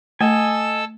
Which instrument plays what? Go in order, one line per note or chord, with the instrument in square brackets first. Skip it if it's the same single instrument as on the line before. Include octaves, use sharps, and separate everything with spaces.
[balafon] A3 [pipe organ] A4 E6 [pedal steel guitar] D#5 G#5